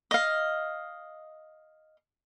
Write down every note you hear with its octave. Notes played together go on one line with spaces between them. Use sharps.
D#5 F5